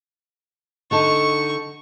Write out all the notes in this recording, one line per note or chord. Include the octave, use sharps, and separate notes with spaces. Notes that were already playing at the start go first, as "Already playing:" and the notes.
D3 D#4 A4 C#6